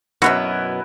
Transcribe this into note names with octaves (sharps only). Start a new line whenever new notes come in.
F#2 B2 B3 E4 F#4 A#4 B4